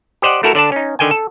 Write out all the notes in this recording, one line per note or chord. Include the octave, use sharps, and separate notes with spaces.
G4 C5 D5 D#5 F#5
A3 E4 F#4 A4 A#4
D3 D4 D5 A5
C#4 D#4
D3 D#3 G5 G#5
A4